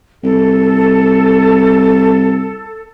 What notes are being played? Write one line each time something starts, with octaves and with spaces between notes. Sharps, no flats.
C2 A4